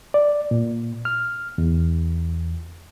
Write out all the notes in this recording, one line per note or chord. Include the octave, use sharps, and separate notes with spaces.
D5
A#2
F6
E2